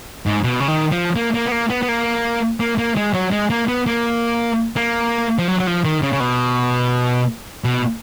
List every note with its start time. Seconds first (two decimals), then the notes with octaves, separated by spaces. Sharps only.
0.26 G#2
0.44 B2
0.60 C#3
0.68 D#3
0.91 F3
1.16 A#3
1.34 A#3
1.47 B3
1.52 A#3
1.70 B3
1.83 B3
1.89 A#3
2.60 A#3
2.78 A#3
2.96 G#3
3.14 F#3
3.32 G#3
3.50 A#3
3.68 B3
3.86 A#3
4.76 A#3
5.39 F3
5.48 F#3
5.59 F#3
5.67 F3
5.85 D#3
6.02 C#3
6.13 C#3
6.20 B2
7.64 B2